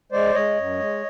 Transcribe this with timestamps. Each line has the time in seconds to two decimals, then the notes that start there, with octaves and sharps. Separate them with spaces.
0.12 G#3 C5 D5
0.35 G#3 C#5 D#5
0.57 F#2
0.79 G#3